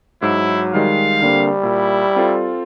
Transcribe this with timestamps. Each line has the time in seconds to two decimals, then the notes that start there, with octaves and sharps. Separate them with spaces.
0.22 G#2 F#3 E4
0.74 D#3 G3 G#3 F5
1.22 D3 G3 A#3 C4
1.63 A#2 E4
2.16 C4 F4 A4